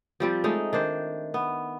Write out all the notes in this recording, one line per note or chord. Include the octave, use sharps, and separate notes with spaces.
F3 G3 C4
G#3 A3 D#4
D#3 D4 C5
B3